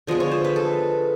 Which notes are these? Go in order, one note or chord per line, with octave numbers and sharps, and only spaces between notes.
D3 F3 G#3 B3 D#5
C#5
C5
B4
A4